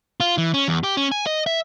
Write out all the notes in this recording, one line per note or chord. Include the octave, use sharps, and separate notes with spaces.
F4
E3
C#4
E2
G4
C#4
G#5
D#5
E5